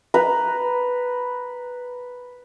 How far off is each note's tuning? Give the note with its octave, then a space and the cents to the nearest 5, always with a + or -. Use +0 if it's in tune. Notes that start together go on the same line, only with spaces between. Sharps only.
B4 +0 A#5 +0